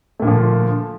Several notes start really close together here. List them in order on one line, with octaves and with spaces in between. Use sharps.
A3 A#2 D3 F3